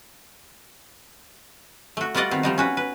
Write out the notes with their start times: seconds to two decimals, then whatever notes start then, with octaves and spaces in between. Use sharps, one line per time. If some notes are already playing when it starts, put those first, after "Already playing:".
1.97 A3 F#4
2.15 G3 F4 F#4 D5 D#5 F#5
2.31 D#3 B3 C4
2.43 F3 G3 D#4
2.58 C#4 F#4 B4
2.77 B4